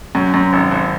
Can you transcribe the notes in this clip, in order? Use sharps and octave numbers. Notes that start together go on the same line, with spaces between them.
F#2
F#2
G#1
G#1